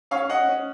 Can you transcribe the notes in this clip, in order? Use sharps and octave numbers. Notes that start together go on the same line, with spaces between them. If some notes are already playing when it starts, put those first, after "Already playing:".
C#4 C#5 F5
C#4 D#5 F#5
C#4